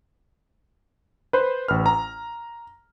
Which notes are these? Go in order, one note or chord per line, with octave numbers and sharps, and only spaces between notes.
B4 C5
A1 B4 F6
A#5